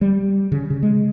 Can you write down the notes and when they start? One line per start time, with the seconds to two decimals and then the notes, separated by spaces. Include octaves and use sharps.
0.01 G3
0.52 C#3
0.70 C#3
0.83 G#3